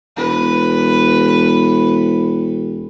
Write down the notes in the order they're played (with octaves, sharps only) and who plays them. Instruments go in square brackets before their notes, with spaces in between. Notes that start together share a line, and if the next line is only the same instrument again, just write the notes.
[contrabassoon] E1 [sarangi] B4